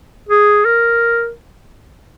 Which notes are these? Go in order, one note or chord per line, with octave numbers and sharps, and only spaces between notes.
G#4
A#4